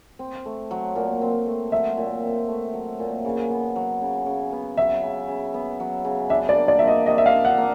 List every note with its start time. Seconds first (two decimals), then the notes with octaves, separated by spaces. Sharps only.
0.19 C4
0.45 A3
0.71 F#3
0.96 A#2
1.21 C4
1.46 A3
1.72 F#3 E5
1.97 A#2
2.23 C4
2.48 A3
2.73 F#3
2.99 A#2
3.25 C#3
3.50 B3
3.76 F#3
4.02 C#3
4.26 C#3
4.52 B3
4.77 F#3 E5
5.03 C#3
5.28 C#3
5.54 B3
5.80 F#3
6.05 C#3
6.30 D4 E5
6.49 D5
6.55 A#3
6.68 D5
6.79 F3 E5
6.87 D#5
7.06 C3 D#5
7.18 E5
7.26 F5
7.32 D4
7.45 F#5
7.58 A#3